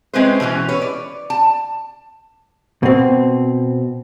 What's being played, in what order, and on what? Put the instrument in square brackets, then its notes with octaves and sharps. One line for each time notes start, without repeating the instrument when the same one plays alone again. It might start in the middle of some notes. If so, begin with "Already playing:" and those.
[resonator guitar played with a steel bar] G#3 C4 C#4 E4 B4 C5
B2 E3 A3 C#4
B4 C#5
D5
A5
[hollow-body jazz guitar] B2 C4